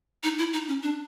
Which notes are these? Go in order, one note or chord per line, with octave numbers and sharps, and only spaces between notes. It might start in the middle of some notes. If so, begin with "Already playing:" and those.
D#4
E4
D#4
C#4
D4